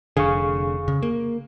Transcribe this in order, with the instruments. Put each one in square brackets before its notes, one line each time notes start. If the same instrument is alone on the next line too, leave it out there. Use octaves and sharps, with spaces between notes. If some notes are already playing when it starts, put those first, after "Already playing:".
[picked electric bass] F1 D3 [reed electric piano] G#4 F5 C#6
[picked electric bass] C#3
A#3